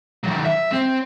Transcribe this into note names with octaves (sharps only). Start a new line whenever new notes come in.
D#3 F#3
E5
C4